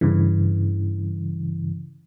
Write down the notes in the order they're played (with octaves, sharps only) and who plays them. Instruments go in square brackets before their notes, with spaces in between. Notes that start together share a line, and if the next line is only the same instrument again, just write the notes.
[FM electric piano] G2 C#3 E3